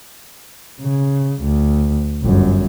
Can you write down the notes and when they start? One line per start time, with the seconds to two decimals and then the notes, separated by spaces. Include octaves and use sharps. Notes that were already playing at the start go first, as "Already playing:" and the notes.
0.81 C#3
1.43 D2
2.24 G1 F#2